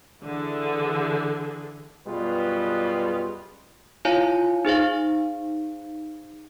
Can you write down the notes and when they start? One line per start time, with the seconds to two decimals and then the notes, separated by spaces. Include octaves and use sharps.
0.24 D3 E3 G#4
2.07 F#2 B2 G3 F4 G#4 B4
4.05 E4 F4 C#5 F5 G#5
4.65 D#4 G#4 C5 F5